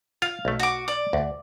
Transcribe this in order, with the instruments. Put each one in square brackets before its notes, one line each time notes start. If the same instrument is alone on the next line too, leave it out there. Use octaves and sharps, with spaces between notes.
[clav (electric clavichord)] F4 [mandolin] F5
[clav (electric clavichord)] B1 A3
[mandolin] F#4 D6
D5
[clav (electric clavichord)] D2